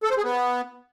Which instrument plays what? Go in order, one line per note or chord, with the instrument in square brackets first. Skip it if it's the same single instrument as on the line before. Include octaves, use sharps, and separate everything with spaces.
[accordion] A4
C5
G#4
B3